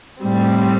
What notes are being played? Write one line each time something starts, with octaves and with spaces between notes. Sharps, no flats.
A2 G3 C4